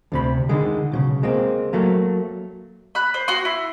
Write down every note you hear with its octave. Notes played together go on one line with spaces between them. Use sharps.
D2 C3 B5
D3 D#3 G#3
B1 A#2 C#3
G#3 A#3 C4
F#3 A3 A#3
B5 F#6
C5
F#4 C6
E4